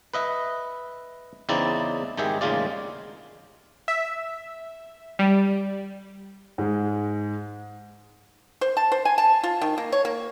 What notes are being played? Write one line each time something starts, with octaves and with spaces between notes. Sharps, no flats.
B4 D#5 E5
E2 C#3 C4 D#4 E4 D5
G#1 D#3 G4 G#4 E5
A1 D#2 C#3 G#3 F4 D5
E5
G3
G#2 G#3
C5
A5
C5
G#5
A5
F4
D#3
A#3
C#5
A#3